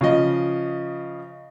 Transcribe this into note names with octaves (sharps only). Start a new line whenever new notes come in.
C#3 F3 D#5